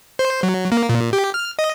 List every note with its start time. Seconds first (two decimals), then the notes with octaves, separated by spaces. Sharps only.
0.19 C5
0.43 F#3
0.72 A#3
0.89 A#2
1.13 G4
1.34 F6
1.59 D#5